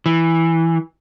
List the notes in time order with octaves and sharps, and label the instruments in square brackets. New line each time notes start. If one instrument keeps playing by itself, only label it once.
[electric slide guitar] E3